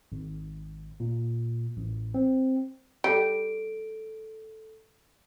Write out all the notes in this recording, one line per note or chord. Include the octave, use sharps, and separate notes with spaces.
G#1
A#2
A1
C4
G3 A4 D7